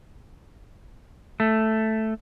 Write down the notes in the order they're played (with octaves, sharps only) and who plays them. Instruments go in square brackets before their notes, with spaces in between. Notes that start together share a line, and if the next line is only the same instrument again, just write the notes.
[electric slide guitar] A3